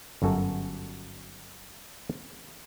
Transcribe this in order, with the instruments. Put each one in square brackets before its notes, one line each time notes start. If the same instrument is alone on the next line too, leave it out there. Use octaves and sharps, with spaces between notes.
[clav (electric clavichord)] G1 F#2 F#4 A4